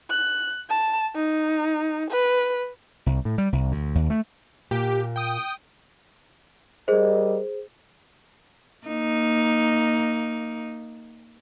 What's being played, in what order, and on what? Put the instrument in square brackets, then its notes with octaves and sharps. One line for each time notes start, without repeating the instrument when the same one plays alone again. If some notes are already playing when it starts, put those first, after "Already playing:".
[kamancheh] F#6
A5
D#4
B4
[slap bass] C2
A2
G3
C2
D2
D#2
A3
[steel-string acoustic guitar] A#2 [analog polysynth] G4
[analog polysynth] G5 D#6
[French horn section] G3 A#4 D#5 [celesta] G#4 C5
[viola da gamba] A#3 D#4